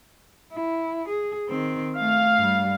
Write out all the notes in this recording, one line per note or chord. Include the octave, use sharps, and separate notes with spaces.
E4
G#4
D#3 C4
A3 F5
G2 G3